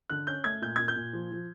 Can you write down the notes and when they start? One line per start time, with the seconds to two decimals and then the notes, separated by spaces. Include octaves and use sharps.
0.10 D3 F#6
0.27 C#4 G6
0.44 A3 G#6
0.62 A#2 G6
0.76 A#2 G#6
0.88 G6
0.96 A#2
1.13 F3
1.32 F3